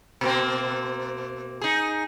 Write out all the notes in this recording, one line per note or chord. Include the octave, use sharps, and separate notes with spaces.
B2 A#3 C4
D#4 G#4